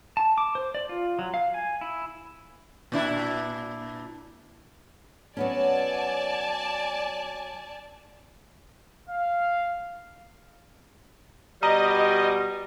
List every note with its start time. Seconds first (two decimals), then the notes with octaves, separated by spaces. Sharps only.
0.17 A5
0.38 D6
0.55 C5
0.75 D5
0.89 F4
1.19 F#3
1.34 F5
1.54 G#5
1.81 E4
2.92 A#2 D4 E4
5.37 F#3 B3 C#4 D5 G#5 A5
9.10 F5
11.63 B2 G3 D#5 A#5